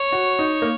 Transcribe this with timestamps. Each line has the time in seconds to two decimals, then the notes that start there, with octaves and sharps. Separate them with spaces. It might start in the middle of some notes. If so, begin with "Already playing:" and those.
Already playing: C#5
0.13 F#4
0.39 D#4
0.62 A#3